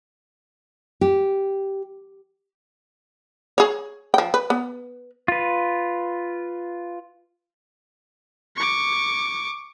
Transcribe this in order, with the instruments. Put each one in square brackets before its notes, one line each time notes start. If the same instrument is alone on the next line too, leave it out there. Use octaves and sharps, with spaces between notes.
[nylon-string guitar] G4
[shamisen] G#4 C#5
F3 G5
B4
B3
[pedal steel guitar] F4 B4
[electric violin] C#6 D6